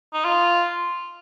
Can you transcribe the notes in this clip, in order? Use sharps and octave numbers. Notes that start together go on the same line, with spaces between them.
D#4
F4